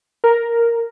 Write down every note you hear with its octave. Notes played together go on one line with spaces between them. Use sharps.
A#4